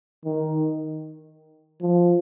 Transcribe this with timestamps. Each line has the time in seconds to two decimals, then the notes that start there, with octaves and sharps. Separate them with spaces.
0.25 D#3
1.81 F3